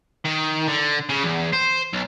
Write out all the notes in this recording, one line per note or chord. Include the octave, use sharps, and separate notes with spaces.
D#3
D3
C#3
E2
C5
B1